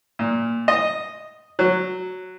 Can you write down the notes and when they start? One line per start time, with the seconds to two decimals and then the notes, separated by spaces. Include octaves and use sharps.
0.19 A#2
0.68 D#5
1.59 F#3